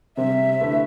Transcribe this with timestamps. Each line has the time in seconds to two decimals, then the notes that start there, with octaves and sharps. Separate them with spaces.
0.17 C3 G3 C4 E5
0.61 D3 A3 E4 B4